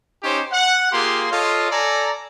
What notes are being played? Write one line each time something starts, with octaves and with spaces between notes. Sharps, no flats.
C#4 D#4 G4 C5 C#5
F#5
A#3 F4 G4 G#4 C6
F4 A4 C#5 D#5 F5
A4 D5 G#5 A#5